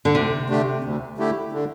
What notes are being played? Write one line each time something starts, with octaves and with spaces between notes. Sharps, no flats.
D3
D2 C3
D3 A3 D4 G4
D2
D3 A3 E4 G4
D3